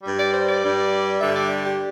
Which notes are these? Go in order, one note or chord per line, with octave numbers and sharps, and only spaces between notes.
G2 G3
D5
C5
D5
G2 G3
G2 D3 G3 E5
D5
G4